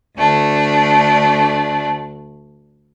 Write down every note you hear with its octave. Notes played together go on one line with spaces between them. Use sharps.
D2 A3 D4